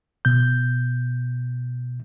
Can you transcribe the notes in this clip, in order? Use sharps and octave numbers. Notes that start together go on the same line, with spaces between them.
B2 G6